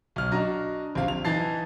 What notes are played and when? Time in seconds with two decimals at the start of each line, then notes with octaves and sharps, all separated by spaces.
0.16 B1 F6
0.32 D4 F#4 D#5 A#5
0.95 A#1 C3 F5
1.08 F7
1.25 E3 D#4 A5 A6 C7